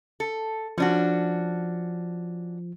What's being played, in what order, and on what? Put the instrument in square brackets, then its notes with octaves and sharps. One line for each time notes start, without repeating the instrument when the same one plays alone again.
[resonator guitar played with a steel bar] A4
[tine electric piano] F3 [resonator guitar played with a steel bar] C#4 D4 F#4